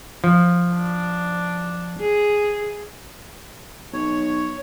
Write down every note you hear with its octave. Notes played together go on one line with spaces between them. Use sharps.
F3
D4
G#4
B1 C#5